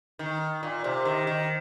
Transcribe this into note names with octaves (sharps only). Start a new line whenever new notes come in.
D#3
A#2
C3
D#3
D#3